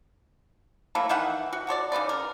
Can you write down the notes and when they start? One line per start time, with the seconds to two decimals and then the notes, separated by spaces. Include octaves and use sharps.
0.95 F#3 A3 A#3 E4
1.09 D#3 E3 E5 F#5
1.53 F#4
1.67 F#4 A4 C#5 D5
1.92 C#3 D#4 B4 D5
2.09 A#4